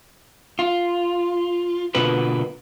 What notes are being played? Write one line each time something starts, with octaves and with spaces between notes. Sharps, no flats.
F4
B2 D3 A#3 F4 B4